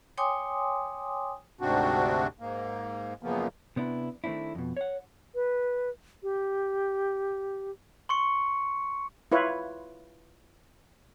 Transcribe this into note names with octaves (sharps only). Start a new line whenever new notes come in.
C#5 G5 G#5 C6 D6 D#6
D2 G#2 C3 C4 D4 F#4
G#2 A#3
F#2 A#2 C#3 F3 A#3 B3
C3 B3 D4 E4
D#3 A3 C4 D4 E4
F2 B2
C#5 F#5
B4
G4
C6 C#6 C#7
E4 F4 B4 C#5